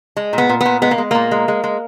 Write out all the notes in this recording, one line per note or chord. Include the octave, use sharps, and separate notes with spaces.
G#3
A#2
B3
A#2
A#2 B3
G#3 B3
A#3
G#3
A#2 A#3
G#3
G#3
G#3